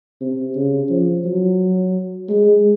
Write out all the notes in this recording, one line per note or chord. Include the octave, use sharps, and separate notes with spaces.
C3
C#3
F3
F#3
G#3